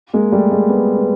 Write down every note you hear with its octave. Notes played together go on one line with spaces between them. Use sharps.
G#3 A#3
G3 A3
G#3 A#3
A3 B3
B3